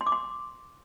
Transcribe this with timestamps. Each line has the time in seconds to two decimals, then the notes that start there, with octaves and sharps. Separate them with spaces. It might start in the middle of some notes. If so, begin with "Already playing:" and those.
0.01 C6
0.06 D6
0.12 C6